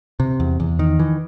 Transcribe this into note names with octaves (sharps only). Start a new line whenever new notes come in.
C3
E2
E2
D#3
E3